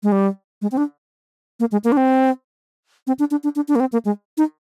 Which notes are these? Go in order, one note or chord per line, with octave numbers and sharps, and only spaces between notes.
G#3
G3
G#3
C4
D4
A#3
G#3
A#3
D4
C4
C4
D4
D4
D4
D4
D4
A#3
C4
A#3
G#3
D#4